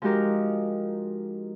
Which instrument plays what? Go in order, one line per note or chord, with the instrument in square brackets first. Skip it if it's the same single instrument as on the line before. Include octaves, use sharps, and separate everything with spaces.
[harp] F3 G#3 D#4 F#4 G4 A#4